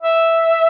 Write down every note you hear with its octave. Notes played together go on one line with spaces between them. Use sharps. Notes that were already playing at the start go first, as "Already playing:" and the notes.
E5